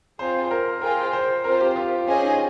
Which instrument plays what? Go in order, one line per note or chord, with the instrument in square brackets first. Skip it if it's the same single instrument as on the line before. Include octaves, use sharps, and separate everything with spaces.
[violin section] C4 F4 G#4 [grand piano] C5
[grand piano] C5
A#4
[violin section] F4 G#4 C5 G5 [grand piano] A#4
[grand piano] C5
[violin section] C4 F4 C5 [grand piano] A#4
[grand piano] G4
F4
[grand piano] C#4 [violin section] G#4 C5 D#5 G#5
[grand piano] D#4